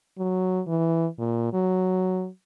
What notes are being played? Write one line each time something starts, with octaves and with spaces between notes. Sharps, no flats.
F#3
E3
A#2
F#3